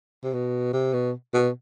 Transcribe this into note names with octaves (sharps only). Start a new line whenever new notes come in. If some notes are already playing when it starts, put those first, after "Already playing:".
C3
B2
C3
B2
B2